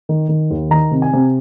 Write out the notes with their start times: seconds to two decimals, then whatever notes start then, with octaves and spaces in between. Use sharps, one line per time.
0.09 D#3
0.29 D#3
0.51 D#2
0.70 D#3 A#5
0.91 C3
1.02 G#5
1.13 C3